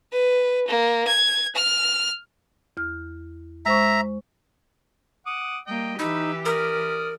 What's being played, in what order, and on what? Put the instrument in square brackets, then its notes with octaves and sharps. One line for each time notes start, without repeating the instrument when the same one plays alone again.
[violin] B4
A#3
G#6
F6
[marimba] E2 F6
[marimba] G#3 C5 C#6 [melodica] E5 A#5
[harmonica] F#5 D6 D#6
[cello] G3 A#3 [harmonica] D#5 G5
[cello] E3 G4 [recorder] D#4 [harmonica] B4 E6
[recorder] A#4 [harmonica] D5 D#6 F6